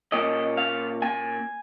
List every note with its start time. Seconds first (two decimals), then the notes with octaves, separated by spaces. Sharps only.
0.12 A#2 A#3 C#4 D#5
0.57 F5
1.02 G#5